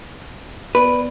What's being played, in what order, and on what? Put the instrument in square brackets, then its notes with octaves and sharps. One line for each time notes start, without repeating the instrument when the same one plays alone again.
[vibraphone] B3 D5 [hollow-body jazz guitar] B4